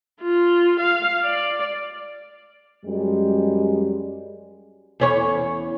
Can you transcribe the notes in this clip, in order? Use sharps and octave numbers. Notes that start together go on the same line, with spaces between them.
F4
F5
D5
F#2 G3 G#3
E2 C#4 C#5